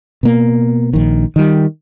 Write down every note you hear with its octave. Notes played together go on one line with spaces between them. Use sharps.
B2 A#3
A#1 D#3
D#3 G3